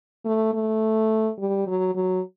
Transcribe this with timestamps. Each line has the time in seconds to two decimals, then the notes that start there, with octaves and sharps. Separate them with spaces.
0.25 A3
0.53 A3
1.38 G3
1.67 F#3
1.95 F#3